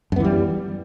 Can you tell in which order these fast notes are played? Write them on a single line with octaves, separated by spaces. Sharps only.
F#2 B3 E3 G3